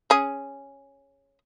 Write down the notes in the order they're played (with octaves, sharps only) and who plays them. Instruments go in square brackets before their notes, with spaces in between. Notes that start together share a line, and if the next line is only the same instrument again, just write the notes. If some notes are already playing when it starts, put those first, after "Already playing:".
[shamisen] C#4 G#4